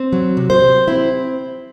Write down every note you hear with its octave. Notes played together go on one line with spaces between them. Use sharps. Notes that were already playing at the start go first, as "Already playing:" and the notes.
Already playing: C4
F#3
C3
C5
C3
C4 E4